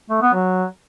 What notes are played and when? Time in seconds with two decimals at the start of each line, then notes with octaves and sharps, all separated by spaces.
0.10 A3
0.22 B3
0.33 F#3